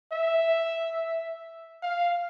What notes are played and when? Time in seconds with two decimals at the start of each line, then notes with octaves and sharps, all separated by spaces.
0.12 E5
1.82 F5